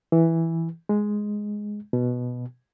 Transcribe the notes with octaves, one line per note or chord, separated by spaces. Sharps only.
E3
G#3
B2